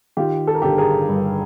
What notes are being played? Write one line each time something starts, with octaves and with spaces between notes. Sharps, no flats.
D#3 F4 G4
A4
A#4
G1 G4 A4
G#4 A#4
G2